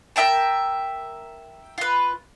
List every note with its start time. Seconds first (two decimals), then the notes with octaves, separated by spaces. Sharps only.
0.16 A#4 E5 G5 A5
1.78 F4 B4